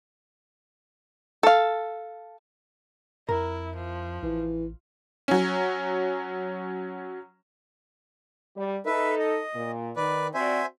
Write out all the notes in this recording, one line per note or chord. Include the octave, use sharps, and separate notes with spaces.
A4 F5
F2 E4 A#4
F3
A1 E3
F#3 C#4
G3
D#4 A4 B4 E5
D#5
A#2
D#3 B4 D5
C4 F#4 C5 D5 E5 G#5